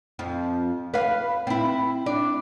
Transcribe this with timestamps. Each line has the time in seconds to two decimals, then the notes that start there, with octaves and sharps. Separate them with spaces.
0.19 F2 F3
0.94 B4 F5
1.47 C4 E4
2.06 D4